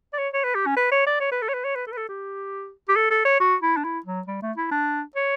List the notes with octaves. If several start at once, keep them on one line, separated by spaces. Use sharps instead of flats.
D5
C#5
C#5
B4
G4
C#4
B4
C#5
D5
C#5
B4
A4
C#5
B4
C#5
B4
A4
B4
A4
G4
G4
A4
A4
C#5
F#4
E4
D4
E4
F#3
G3
A3
E4
D4
C#5